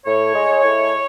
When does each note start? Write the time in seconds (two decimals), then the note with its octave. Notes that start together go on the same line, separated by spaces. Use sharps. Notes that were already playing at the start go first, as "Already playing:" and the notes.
0.05 A2 C#5
0.35 G#3
0.64 A2